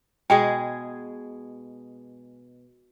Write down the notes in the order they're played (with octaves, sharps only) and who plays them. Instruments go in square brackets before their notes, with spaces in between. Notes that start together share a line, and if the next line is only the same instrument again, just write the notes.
[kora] B2 G#3 G#4 [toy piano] G5